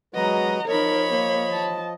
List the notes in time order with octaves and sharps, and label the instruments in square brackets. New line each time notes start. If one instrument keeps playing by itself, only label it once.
[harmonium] F#3 G#3 B4 [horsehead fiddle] F#4 A#5 [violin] D#5
[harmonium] F3 D#5 [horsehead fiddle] D#4 A#4 [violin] C#5 B5
[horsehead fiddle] A#3
A5